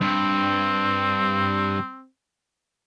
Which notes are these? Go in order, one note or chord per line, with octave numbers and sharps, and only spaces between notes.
G2 C4